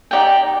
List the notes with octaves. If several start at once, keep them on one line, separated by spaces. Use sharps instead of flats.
D#4 G4 D5 G5